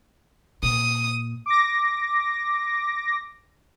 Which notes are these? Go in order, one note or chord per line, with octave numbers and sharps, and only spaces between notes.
A#2 D#6
D6 A#6